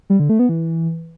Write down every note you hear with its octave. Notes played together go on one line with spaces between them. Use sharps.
G3
D3
A3
B3
E3